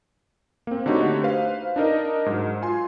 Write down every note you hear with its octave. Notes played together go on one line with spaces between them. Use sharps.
A#3 C4
D3 A3 D#4 F#4 G4 C#5
B4 C5 F5
D4 D#4 A#4 D#5
G#2 F#3
F4 G#5 C6